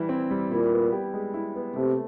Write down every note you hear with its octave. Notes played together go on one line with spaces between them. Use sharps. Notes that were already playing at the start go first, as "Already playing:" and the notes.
Already playing: E3 G3 E4
C4
G3
A#2 E4
B3
G4
G#3
E4
B3
C3 A3